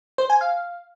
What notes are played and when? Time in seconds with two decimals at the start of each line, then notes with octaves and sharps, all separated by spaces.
0.18 C5
0.30 G#5
0.41 F5